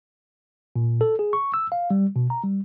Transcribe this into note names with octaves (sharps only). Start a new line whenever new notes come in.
A#2
A4
G#4
C#6
E6
F5
G3
B2
A#5
G3